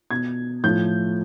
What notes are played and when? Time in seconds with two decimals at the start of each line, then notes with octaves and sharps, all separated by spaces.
0.11 B2 G#6
0.64 A2 F3 G6